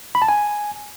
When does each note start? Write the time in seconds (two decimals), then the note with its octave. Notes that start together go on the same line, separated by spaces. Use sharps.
0.15 B5
0.22 A5
0.29 G#5